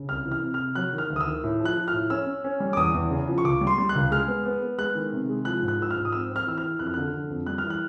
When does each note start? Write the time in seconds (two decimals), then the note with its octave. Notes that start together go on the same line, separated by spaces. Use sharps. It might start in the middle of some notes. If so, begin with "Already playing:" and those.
Already playing: C#3
0.09 C2 F6
0.26 E3
0.32 F6
0.42 C3
0.54 F6
0.59 C3
0.75 F#3 F#6
0.93 D#3
0.98 F6
1.10 D2
1.16 D#6
1.21 E6
1.26 D#3
1.44 A2
1.60 F3 F#6
1.77 F3
1.88 F6
1.93 A2
2.10 C#4 E6
2.26 C#4
2.44 C#4
2.60 G3
2.73 D6
2.77 E2 D#6
2.94 E2
3.11 C#3
3.28 F3
3.38 C#6
3.44 C#2 D6
3.61 G3
3.67 C6
3.78 G3
3.89 F#6
3.95 C#2
4.11 G#3 F6
4.28 B3
4.45 B3
4.62 B3
4.78 G#3 F#6
4.95 D#3
5.13 C3
5.29 G#3
5.45 F3 F#6
5.62 G#2
5.68 F#6
5.79 F3 E6
5.91 G#2 F6
6.05 D#6
6.12 C4 E6
6.30 C4
6.36 F6
6.46 E3 E6
6.58 F6
6.63 E3
6.79 F2 F#6
6.87 F6
6.94 D3 F#6
7.14 D3
7.30 F2
7.46 G3 F#6
7.58 F6
7.64 E3
7.70 F#6